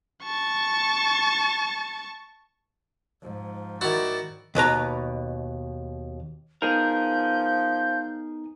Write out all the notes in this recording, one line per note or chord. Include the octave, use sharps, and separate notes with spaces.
A5 C#6
G#2 F3
D#3 E4 F#4 D5
D#2 B2 B4 A#5
F3 B3 D#4 G#4 A#4 G6